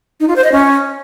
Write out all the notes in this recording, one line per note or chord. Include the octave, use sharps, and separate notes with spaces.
D#4
F4
C5
D#5
C#4